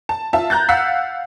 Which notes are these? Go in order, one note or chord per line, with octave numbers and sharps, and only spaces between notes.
A5
F4 E5 A5
A#5 F#6 G6 A6
F5 F#5 E6 F#6 B6